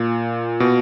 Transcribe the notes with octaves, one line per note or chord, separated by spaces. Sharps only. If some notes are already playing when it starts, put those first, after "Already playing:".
Already playing: A#2
B2